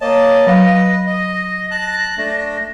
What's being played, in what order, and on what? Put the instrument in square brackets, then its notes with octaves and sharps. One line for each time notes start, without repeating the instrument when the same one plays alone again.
[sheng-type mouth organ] A#3 D#5 A5 [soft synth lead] C#5
[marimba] F#3 F5 [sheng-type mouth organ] B4 D#5 [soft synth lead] A#6
[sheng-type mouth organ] D#5
A5 F#6
A3 D4